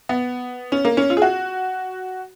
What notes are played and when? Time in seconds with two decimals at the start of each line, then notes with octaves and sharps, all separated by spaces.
0.09 B3
0.72 C#4
0.85 A#3
0.97 C#4
1.10 F4
1.17 G#4
1.22 F#4